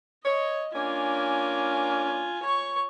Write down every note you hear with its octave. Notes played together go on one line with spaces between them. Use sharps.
C#5 D#5
A#3 C#4 D4 F4 G#5
C#5 C#6